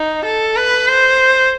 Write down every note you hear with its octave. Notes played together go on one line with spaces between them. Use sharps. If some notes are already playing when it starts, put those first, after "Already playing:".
Already playing: D#4
A4
B4
C5